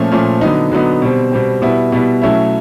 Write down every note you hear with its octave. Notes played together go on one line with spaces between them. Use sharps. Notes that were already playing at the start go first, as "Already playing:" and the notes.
Already playing: A#2 F3 A3 C#4
A#2 F3 A3 C#4
D3 F#3 B3 D#4
D3 F#3 B3 D#4
B2 G3 C4
B2 G3 C4
B2 G3 B3 E4
B2 G3 B3 E4
B2 F#3 A3 C#4 E4